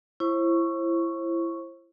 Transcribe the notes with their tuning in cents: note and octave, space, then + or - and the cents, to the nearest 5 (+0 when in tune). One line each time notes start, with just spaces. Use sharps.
E4 +25 C5 +40 C#6 +0